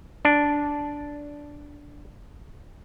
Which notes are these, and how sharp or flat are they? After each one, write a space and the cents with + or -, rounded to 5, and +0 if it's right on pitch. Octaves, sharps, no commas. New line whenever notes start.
D4 -10